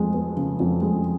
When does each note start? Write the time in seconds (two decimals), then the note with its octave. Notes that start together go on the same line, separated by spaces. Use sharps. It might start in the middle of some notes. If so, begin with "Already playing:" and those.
Already playing: F2 G#3
0.14 B3
0.37 C#3
0.60 F2
0.82 G#3